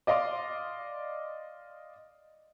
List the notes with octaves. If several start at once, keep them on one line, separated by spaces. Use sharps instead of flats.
D5 D#5 F5 C6 D6